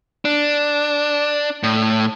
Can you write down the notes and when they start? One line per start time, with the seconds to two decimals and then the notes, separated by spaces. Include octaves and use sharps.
0.25 D4
1.63 A2